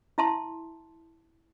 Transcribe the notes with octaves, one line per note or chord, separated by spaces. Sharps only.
E4 E5 A5 C6